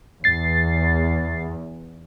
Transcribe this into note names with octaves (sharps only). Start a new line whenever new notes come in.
E2 A6 C7